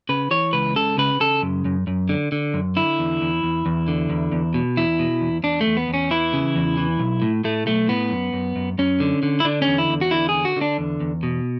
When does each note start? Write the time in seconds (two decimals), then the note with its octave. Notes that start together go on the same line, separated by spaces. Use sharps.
0.09 C#3 B4
0.31 E3 C#5
0.53 C#2 B4
0.76 C#3 A4
0.98 C#3 B4
1.20 C#3 A4
1.42 F#2
1.65 F#2
1.87 F#2
2.09 D3
2.32 D3
2.54 F#2
2.76 D3 E4
2.99 E2
3.21 E2
3.43 E2
3.66 E2
3.88 D3
4.10 E2
4.32 E2
4.54 B2
4.77 E2 E4
4.99 B2
5.21 E2
5.43 E2 D4
5.61 A3
5.66 E2
5.77 B3
5.88 E2
5.94 C#4
6.11 E3 E4
6.33 C#3
6.56 E2
6.77 E3
6.99 B1
7.22 A2
7.44 A2 A3
7.66 B1 A3
7.88 A2 B3
8.10 F#2
8.33 F#2
8.56 F#2
8.78 F#2 C#4
9.00 D3
9.23 D3
9.40 E4
9.45 D3 D4
9.62 C#4
9.67 E2
9.78 E4
9.89 E2
10.01 F#4
10.11 D3 E4
10.29 D3 G#4
10.45 F#4
10.56 D3 D4
10.78 E2
11.00 E2
11.23 B2